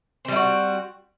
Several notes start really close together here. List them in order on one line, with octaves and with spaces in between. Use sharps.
C4 G3 E4 F#4